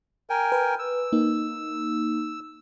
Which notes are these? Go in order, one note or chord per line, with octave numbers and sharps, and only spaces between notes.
A#4 G5 G#5
B4
E6
A#3 D#4